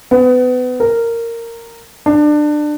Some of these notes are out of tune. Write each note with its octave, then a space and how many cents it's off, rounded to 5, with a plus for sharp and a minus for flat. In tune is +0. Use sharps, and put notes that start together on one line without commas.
B3 +30
A#4 -10
D4 +25